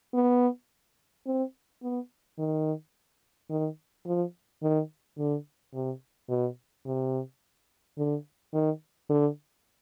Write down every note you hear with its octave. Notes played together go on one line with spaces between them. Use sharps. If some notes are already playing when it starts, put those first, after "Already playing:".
B3
C4
B3
D#3
D#3
F3
D#3
D3
C3
B2
C3
D3
D#3
D3